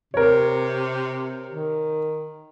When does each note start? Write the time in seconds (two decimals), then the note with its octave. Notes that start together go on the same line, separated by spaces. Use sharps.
0.14 C3 A#4 C#5
1.50 D#3